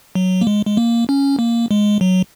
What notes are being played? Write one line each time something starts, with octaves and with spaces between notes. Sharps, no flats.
F#3
A#3
G#3
G#3
A#3
C#4
A#3
G#3
F#3